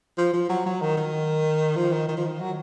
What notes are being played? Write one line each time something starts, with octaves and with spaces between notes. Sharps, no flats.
F3
F3
F#3
F#3
D#3
D#3
F3
D#3
D#3
F3
D#3
F#3